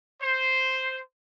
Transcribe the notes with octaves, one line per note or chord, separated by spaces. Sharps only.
C5